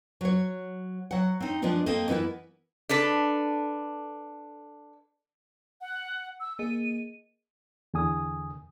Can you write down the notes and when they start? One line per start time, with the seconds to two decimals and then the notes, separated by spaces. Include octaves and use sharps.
0.21 F#3 C#5
1.11 F#3 F#5
1.40 C4 D#4
1.62 F3 G#3 B3 D4 F4
1.86 A#3 C4 A4 D#5
2.08 E3 B3 E4 A#4 B4
2.89 D4 A4 B4
5.81 F#5
6.40 E6
6.59 A#3 G#4 D#5 D#7
7.94 E2 D3 G#5 D#6